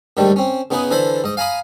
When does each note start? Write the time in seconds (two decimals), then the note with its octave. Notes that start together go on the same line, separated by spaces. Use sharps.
0.17 G#2 D3 D#3 G3 A3
0.36 C4 C#4
0.71 C#3 B3 D#4 G#4 B4
0.91 D3 E3 A4 C5 B5
1.24 G#2 D#5
1.37 F5 G#5 A#5 B5 D#6